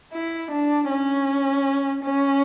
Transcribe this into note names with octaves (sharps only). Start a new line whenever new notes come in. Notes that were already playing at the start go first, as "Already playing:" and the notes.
E4
D4
C#4
C#4